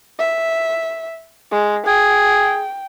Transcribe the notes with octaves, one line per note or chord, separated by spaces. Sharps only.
E5
G#3
G#4 G5